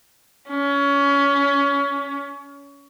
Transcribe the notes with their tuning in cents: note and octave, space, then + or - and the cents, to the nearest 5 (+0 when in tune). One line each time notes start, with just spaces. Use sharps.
C#4 +25